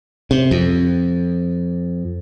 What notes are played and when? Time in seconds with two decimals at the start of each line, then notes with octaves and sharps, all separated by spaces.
0.31 C3
0.51 F2